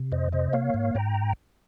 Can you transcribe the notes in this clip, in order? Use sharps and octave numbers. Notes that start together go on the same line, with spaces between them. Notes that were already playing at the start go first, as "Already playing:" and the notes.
Already playing: C3
F2 C5 D#5
C3 C5 D#5
A#3 C#5 F5
G#2
G#2 G5 A#5